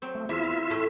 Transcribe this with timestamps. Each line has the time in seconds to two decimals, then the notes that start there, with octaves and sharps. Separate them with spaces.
0.02 F#3 C4
0.15 A3
0.29 E2 E4 F4 E5
0.43 F5
0.70 A2 A3